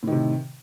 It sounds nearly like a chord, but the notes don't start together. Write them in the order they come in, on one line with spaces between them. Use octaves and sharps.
A2 D#3 C3